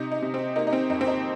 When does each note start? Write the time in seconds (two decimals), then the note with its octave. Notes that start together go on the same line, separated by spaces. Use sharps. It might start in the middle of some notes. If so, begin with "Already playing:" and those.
Already playing: C3 D#4
0.12 D#4
0.22 C3
0.34 C4
0.56 A#3 D#4
0.67 D#4
0.73 C4
0.90 F2 D#4
1.01 C4
1.07 D#4